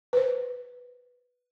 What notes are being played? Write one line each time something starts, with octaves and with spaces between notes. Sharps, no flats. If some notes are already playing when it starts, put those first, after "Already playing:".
B4 C5